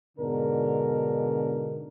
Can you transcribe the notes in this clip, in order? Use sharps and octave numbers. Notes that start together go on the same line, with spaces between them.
G#2 B2 D3 D4 A#4